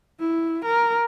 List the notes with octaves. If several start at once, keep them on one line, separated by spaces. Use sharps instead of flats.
E4
A#4